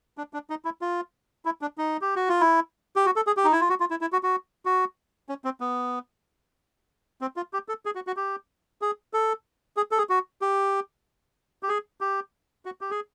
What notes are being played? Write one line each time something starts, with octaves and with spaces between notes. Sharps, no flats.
D4
D4
D#4
E4
F4
E4
D4
D#4
G4
F#4
F4
E4
G4
F#4
A4
G#4
G4
D#4
E4
F4
F#4
F4
E4
E4
F#4
F#4
F#4
C#4
C4
B3
C4
F4
G4
A4
G#4
F#4
F#4
G4
G#4
A4
G#4
A4
G#4
F#4
G4
G4
G#4
G4
F#4
G4
G#4